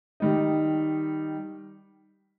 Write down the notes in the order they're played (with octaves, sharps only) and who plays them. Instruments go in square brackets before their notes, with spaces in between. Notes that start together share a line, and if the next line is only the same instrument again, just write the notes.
[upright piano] D#3 G3 D#4